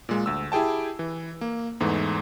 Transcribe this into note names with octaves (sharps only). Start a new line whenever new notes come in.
A#2 G#3
D2 E6
E4 G4 G#4 G5 A5
E3
A#3
E2 G#2 E3 A3